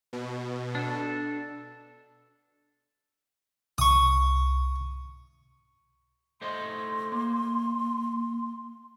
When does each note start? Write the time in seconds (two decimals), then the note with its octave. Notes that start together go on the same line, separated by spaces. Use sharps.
0.13 B2
0.75 D4 A4
3.78 C2 C#6 D#6
6.42 A3 C5 D#5 C6
7.12 A#3